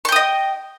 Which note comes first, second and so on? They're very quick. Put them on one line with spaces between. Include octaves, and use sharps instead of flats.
C#6 G5 D#6 D#5